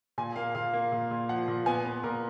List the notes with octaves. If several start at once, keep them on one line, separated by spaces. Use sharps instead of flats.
A#2 G#5
A#3 F5
A#2 F5
A#3
A#2
A#2
F3 F#5
A#2
B3 G#5
B3
A#2 A#4